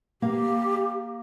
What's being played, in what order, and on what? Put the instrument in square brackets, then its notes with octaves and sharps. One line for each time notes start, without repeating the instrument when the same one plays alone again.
[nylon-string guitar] A#3 F5 [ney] G4